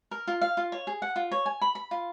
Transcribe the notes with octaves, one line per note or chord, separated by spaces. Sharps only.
A#4
F4
F5
F4
C#5
G#4
F#5
F4
C#5
G#5
B5
B5
F4